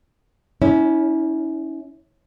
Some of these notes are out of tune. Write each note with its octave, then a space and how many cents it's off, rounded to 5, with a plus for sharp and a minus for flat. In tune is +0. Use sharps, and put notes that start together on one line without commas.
C#4 +20 E4 -30